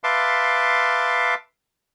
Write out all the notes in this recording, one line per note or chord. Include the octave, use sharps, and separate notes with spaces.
B4 E5 F5 A5 C6 D6